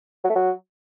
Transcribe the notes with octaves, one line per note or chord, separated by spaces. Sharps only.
F#3
A3
F#3